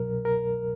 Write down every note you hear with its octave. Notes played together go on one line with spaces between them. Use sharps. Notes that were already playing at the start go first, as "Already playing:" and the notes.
Already playing: C2 B2 F#3 A#4
A#4